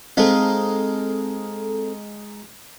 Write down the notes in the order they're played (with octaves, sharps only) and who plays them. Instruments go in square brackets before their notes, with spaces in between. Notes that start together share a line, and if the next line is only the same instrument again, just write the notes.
[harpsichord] G#3 D#4 F5 [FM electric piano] C4 A4